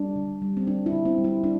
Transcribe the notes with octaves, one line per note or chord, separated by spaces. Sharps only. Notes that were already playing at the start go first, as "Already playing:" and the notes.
Already playing: G3 D4
D3
G3
C4
G3 D4
E4
D3
C4
G3
E4
G3 D4